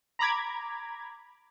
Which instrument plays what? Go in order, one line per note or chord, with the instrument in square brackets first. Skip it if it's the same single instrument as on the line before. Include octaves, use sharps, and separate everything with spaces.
[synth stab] A#5 B5 D6 G#6